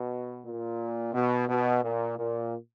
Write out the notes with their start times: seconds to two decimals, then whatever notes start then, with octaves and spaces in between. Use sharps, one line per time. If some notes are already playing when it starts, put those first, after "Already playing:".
Already playing: B2
0.45 A#2
1.14 B2
1.49 B2
1.84 A#2
2.18 A#2